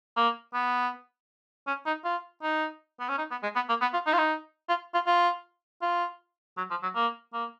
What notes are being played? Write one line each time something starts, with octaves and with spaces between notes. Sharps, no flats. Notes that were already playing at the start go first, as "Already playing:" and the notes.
A#3
B3
C#4
D#4
F4
D#4
B3
C#4
D#4
B3
G#3
B3
A#3
B3
F4
D#4
F4
D#4
F4
F4
F4
F4
F#3
F3
F#3
A#3
A#3